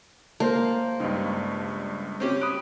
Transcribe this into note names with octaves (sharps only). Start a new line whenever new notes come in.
A#3 A#4 C5 A5
C#2 G2 D#4
C4 C#4 G4
B5 D#6 F#6 D7